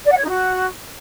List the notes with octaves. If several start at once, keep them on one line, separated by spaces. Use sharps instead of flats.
D5
F#5
C#5
D#4
F#4